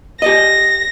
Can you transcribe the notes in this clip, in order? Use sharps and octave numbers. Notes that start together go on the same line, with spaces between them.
G4 D5 D#5 A#6